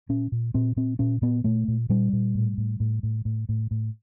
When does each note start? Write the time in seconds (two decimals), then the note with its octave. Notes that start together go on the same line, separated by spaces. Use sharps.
0.09 A#2 C#4
0.32 A#2
0.54 A#2 C4
0.76 A#2 C4
0.99 A#2 C#4
1.22 A#2 B3
1.44 A#2 A3
1.68 A#2
1.90 A#2 G3
2.13 A#2
2.35 A2
2.58 A2
2.80 A2
3.03 A2
3.25 A2
3.49 A2
3.71 A2